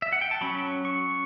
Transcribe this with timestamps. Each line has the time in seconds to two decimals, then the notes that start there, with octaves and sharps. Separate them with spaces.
0.02 E5
0.12 F#5
0.21 G5
0.31 A5
0.41 F#3 C#4 B5
0.85 C#6